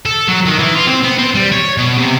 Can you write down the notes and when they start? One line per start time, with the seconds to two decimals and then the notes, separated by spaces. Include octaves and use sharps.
0.06 A4
0.28 F#3
0.46 D#3
0.59 E3
0.75 F4
0.87 C4
1.04 B3
1.18 C4
1.35 G3
1.52 C#5
1.77 B2
1.97 C3